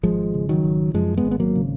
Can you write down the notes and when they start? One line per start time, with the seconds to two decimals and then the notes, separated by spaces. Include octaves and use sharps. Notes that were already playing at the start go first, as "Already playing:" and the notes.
0.03 G#1 F3 G#3
0.34 C#3
0.49 D#3 F#3
0.64 G#1
0.94 F#2 F3 G#3
1.17 G#3 B3
1.25 G#1
1.31 B3
1.40 F#3 A#3
1.55 C#3